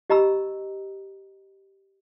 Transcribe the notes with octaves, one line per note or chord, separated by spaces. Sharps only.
G4 D#5 A#5 B5 E6